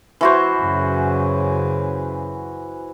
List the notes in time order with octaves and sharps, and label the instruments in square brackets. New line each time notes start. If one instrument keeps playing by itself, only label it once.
[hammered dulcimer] E3 F#4 C5
[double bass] F#2 C#3